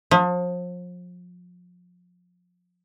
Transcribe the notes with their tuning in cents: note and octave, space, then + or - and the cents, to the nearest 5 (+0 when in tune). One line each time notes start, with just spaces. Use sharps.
F3 +35